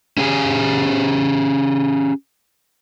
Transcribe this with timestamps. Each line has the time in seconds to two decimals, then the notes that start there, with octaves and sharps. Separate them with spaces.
0.17 C#4 G4 G#4 G5 G#5